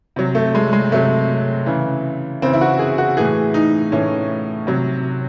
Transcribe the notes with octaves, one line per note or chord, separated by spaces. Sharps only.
C3 F#3
A3
G#3
G#3
C3 F#3 A3
C#3 E3
C#3 E3 C4
E4
F#4
G#4
F#4
A2 E3 G#4
D#4
A2 E3 C#4
C3 F#3